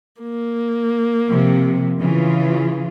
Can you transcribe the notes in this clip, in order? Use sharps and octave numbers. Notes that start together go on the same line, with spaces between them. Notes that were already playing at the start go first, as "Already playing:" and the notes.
A#3
C3 F3
C#3 E3 F4